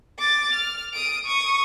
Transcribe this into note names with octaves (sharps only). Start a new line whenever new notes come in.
D6 A6
F6
D#6 D7
C#6 D#6